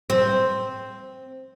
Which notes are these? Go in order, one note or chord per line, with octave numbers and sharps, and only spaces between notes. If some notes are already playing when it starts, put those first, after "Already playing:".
C4